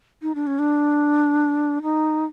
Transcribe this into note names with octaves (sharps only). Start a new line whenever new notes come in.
D#4
D4
C#4
D4
D#4